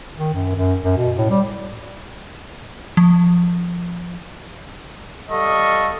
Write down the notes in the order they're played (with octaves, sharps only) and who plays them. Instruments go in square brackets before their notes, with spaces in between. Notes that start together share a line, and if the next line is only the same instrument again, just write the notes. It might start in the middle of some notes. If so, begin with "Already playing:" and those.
[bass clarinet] D#3
F#2
F#2
F#2
B2
A2
G3
[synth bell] F3
[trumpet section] G3 A4 D#5 F5 C#6